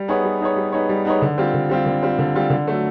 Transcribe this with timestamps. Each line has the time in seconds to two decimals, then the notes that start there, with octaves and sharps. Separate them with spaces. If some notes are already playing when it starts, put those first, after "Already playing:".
Already playing: G3
0.08 B3 D#4 G#4 C#5
0.24 G3
0.41 B3 D#4 G#4 C#5
0.56 G3
0.72 B3 D#4 G#4 C#5
0.89 G3
1.05 B3 D#4 G#4 C#5
1.22 D3
1.38 G3 C4 F4
1.54 D3
1.69 G3 C4 F4
1.86 D3
2.02 G3 C4 F4
2.19 D3
2.35 G3 C4 F4
2.50 D3
2.68 F#3 A3